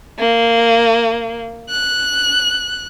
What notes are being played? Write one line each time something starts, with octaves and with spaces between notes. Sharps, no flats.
A#3
F#6